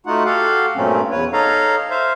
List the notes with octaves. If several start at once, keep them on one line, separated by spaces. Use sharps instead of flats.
A3 D#4 F4 F#4 F#5
F#4 G4 A4 F5 F#5
G2 A#2 F#3 A3 C4 C#4
E2 B4 C#5
D#4 A4 C#5 F5 A#5
C5 E5 F5